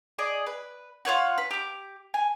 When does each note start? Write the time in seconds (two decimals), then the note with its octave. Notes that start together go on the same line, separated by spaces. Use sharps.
0.19 G#4 D5 D#5
0.46 B4
1.05 F4 B4 C#5 F#5
1.38 B4
1.51 G4 D6
2.14 G#5